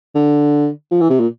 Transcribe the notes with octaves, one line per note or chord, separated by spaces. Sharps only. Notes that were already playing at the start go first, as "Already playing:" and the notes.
D3
F3
E3
C3
A#2